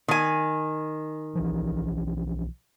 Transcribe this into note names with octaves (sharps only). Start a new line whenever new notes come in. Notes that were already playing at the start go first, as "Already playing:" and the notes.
D#3 G#5
B1 E3 F3